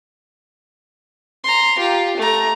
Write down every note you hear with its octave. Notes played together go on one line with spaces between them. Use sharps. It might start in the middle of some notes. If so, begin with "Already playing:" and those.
A#5 C6
F4 G4
A3 A#5